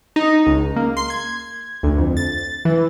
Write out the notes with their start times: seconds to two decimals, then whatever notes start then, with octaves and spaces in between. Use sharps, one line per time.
0.16 D#4
0.47 C#2
0.76 A#3
0.97 C6
1.10 G#6
1.83 D2
1.98 F2
2.17 A6
2.65 E3